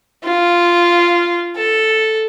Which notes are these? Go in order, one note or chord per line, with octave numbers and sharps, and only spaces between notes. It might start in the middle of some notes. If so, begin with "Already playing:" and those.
F4
A4